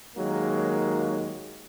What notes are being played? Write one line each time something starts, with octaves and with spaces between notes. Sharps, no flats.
D#2 D#3 F#3 G#3 A#3